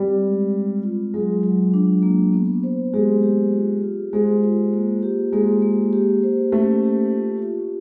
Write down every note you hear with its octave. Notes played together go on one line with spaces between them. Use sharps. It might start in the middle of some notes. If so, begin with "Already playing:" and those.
Already playing: G3 C4
G#3
G#3
F4
F#3 G#3
F#3
D4
A#3
B3
C5
G#3 G4
G4
F4
F4
G#3 C5
F4
A#3
G4
G#3 A#3
A#3
G4
C5
A3 C#4
G4
F4
F4